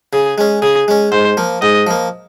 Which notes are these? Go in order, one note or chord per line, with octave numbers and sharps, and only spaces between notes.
C#3 G#4
G#3 C#4
C#3 G#4
G#3 C#4
G#2 C5
F3 A#3
G#2 D#5
F3 A#3